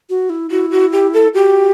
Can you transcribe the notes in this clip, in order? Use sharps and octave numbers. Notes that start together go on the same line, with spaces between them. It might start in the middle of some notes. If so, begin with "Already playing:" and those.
F#4
E4
E4 F#4
F#4
G4
A4
F#4 G4